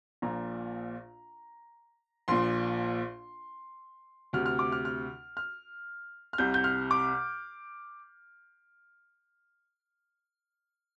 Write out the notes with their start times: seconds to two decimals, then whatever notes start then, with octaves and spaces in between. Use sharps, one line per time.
0.22 A#1 A#2 A#5
2.28 A#1 A#2 C6
4.33 D2 C3 F6
4.46 F6
4.59 D6
4.72 F6
4.85 F6
5.37 F6
6.33 F6
6.38 C2 C3 G6
6.54 G6
6.64 F6
6.91 D6